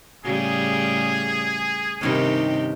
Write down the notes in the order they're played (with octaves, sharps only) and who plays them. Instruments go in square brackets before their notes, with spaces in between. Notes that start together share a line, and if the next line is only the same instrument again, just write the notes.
[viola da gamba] A2 C#3 G3 [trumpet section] G#4
[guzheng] G2 D#3 C#4 [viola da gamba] C3 D#4 G4